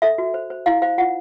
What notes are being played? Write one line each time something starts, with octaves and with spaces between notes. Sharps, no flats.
A4 E5
F#4
C5
C5
E4 F5
C5 F5
F4 F#5